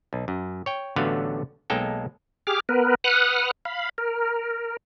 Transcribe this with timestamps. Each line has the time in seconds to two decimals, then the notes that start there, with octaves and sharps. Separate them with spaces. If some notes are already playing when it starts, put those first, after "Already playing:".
0.13 B1
0.28 F#2
0.66 C#5 G5
0.96 A1 D3 F#3 A3 B3 F5
1.70 B1 G#3 A#3 A4 G5
2.47 G4 G#4 D6 F6
2.69 B3 A#4 B4
3.04 B4 F#5 D#6 F6 F#6
3.65 F5 B5
3.98 A#4